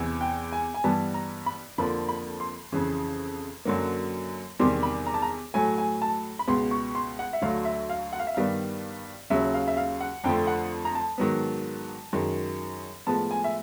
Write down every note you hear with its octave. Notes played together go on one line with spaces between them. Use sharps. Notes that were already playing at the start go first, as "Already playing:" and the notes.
Already playing: E2 C3 E3
G5
G#5
G#5
G2 E3 G3 B3 A5
A#5
B5
F2 D3 F3 A#3 B5
B5
C6
F2 C#3 E3
F#2 D3 F#3 A#3
E2 C3 D#3 G3 C6
B5
A#5
A5
A#5
A2 F#3 A3 G#5
G#5
A5
B5
C#2 B2 G#3 B3 C6
C#6
C6
F#5
E5
D2 D3 F#3 A3 F5
E5
F5
F#5
F5
E5
G2 D#3 G3 B3 F5
D#2 C#3 F#3 E5
F5
E5
F5
F#5
F2 D3 F3 A3 G5
F#5
A#5
A5
G#2 D#3 F#3 B3
F#2 D#3 G#3
A2 F3 G#3 B3 A5
G#5
E5